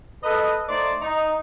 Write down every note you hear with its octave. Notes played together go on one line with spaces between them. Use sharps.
A4 B4 D#5
A3 D#4 C5 D5
D#4